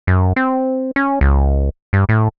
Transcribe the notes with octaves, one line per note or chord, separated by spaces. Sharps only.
F#2
C4
C#4
C#2
G2
A2